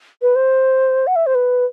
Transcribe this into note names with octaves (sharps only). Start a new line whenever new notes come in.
B4
C5
F#5
E5
C5
B4